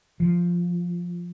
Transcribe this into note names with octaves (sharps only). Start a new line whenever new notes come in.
F3